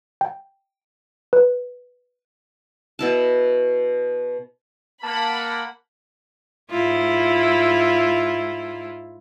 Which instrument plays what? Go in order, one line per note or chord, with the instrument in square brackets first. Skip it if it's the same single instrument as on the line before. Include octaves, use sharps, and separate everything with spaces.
[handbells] G5
B4
[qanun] B2 E4 A5
[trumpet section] A#3 [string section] F#5 B5 [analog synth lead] A5
[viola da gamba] G#2 E4 F4